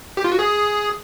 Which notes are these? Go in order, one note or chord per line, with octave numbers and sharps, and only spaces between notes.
G4
F4
F#4
G#4